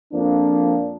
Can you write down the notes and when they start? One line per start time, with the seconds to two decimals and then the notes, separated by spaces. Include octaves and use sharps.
0.13 F2 F3 A#3 D4